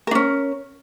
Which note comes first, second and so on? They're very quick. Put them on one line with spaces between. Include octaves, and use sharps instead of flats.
A#4 D4 C#4